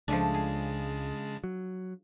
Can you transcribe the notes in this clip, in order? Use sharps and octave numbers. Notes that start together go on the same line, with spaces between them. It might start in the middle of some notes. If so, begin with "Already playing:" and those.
C#2 C#3 F3 G#3 A3 D4 A5
G#4
F#3